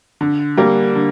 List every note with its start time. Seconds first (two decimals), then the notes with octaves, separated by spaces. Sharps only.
0.21 D3
0.57 G3 A#3
0.95 D3